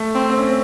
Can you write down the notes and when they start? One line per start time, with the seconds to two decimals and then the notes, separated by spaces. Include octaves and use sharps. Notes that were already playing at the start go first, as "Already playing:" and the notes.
Already playing: A3
0.15 C4
0.30 C4
0.38 C#4
0.47 C4